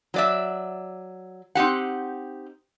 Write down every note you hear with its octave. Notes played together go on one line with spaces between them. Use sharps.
F#3 D5 E5
C4 D#4 G4 F#5